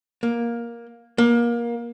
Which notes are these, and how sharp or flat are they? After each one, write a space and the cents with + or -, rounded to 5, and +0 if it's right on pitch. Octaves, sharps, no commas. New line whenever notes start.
A#3 +10
A#3 +25